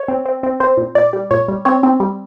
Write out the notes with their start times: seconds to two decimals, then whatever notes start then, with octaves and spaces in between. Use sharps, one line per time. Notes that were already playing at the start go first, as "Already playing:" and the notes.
Already playing: C#5
0.08 C4
0.26 C4
0.43 C4
0.60 C4 C5
0.77 A#2
0.95 A#2 D5
1.13 G3
1.31 A#2 C#5
1.48 G3
1.65 C4 C#5
1.83 C4
2.00 G3